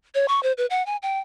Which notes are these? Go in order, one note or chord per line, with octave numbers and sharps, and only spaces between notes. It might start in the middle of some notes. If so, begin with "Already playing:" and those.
C#5
C#6
C5
B4
F#5
G#5
G5